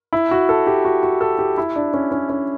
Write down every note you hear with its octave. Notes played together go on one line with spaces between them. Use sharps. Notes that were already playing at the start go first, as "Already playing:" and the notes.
E4
F#4
A4
G4
F#4
F#4
A4
G4
E4
D4
C#4
C#4
C#4